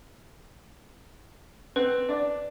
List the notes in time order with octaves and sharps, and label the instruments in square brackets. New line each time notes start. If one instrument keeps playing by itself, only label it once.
[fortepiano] C4 [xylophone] B4
[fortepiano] D4 D5